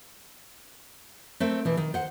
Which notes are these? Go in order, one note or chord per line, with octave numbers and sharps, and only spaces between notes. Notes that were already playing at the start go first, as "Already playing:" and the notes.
A3 C4 A#4 C5
B2 E3
D#3
C5 F#5